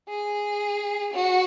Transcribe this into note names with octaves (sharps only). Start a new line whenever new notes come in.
G#4
F#4